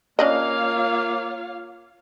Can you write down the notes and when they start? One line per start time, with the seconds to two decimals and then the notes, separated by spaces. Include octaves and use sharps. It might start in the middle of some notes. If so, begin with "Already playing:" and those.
0.19 A#3 C#4 D4 F4 C#5 D#5 F5